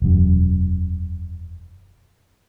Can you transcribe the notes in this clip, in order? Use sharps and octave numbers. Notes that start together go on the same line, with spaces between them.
E1 F#2